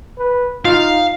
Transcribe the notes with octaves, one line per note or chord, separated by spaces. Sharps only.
B4
D#4 F4 F5